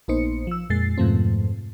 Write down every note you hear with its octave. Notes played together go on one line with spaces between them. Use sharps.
A#1 A#3 B3 D#4 C5 C#7
F3 E6
F2 A#2 G#3 A6 C7
F2 G#2 B2 F3 A3 C4